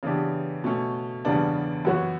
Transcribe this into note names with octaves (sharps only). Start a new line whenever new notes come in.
C#3 E3 B3 D4 G4
B2 A3 C#4
E2 C#3 G3 B3 D4
F#2 E3 B3 F#4 C#5